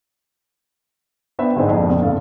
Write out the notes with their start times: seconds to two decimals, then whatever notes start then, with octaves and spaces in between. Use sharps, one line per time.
1.39 B3 D4 B4 C5 E5 G5
1.56 G1 G#2 C4 D#5 G#5
1.69 A#1 F2
1.89 A#1 C3
2.02 G2 C#3 A4 F5